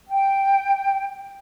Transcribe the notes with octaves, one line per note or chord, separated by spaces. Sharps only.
G5